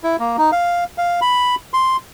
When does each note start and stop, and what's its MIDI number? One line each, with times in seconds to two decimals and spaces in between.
0.03 0.16 64
0.20 0.36 58
0.38 0.51 63
0.52 0.84 77
0.98 1.20 77
1.21 1.55 83
1.73 1.97 84